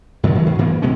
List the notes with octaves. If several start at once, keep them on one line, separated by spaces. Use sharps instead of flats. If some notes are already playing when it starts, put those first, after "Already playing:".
F#2 D#3 F3 F#3
E3 F#3
G#2
F#2 E3 A#3 B3
B2 G#3 B3 C#4